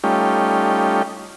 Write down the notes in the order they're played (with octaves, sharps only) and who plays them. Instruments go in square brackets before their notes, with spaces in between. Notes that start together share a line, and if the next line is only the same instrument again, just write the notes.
[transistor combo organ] G3 A3 C#4 D#4 F4 G4